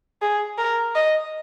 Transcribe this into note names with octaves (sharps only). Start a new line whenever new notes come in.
G#4
A#4
D#5